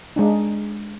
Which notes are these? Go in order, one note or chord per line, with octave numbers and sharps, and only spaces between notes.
G#3 D4 D#4